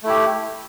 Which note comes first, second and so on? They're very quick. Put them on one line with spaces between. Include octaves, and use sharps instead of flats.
A3 E4 G4